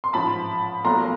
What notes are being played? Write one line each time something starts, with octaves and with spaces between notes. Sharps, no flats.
C6
A1 G#2 F3 A5 B5
B1 A#2 F3 A3 A#5 C6